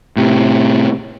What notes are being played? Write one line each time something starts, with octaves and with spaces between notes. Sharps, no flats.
A2 C3